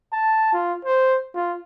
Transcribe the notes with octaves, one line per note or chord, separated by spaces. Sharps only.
A5
F4
C5
F4